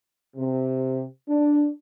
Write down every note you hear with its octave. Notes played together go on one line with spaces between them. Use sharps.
C3
D4